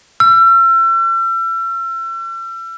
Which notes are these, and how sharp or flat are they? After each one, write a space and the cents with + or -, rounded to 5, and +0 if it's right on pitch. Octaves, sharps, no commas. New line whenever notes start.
E6 +40